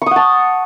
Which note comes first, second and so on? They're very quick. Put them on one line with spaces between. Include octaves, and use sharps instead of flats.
C#6 D#6 F#5 A5